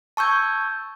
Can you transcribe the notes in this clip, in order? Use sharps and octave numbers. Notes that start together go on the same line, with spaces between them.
A5 C#6 E6 G6 G#6